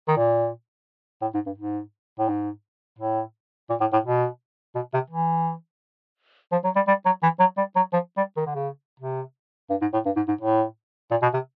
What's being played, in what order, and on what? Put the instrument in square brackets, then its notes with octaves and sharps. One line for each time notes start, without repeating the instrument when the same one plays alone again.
[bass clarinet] D#3
A#2
A2
G#2
G2
G#2
A2
G#2
A2
A#2
A2
A2
B2
B2
C3
E3
F3
F#3
G3
G3
F#3
E3
F#3
G3
F#3
F3
G3
D#3
D3
C#3
C3
G2
G#2
A2
G2
G#2
G#2
A2
A#2
B2
C3